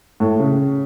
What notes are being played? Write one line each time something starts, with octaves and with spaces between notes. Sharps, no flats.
A2
C#3